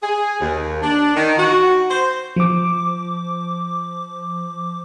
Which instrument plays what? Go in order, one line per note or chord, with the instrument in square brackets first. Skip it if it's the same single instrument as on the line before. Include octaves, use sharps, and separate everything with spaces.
[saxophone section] G#4
D#2
D4
D#3
F#4
C5
[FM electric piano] F3 D6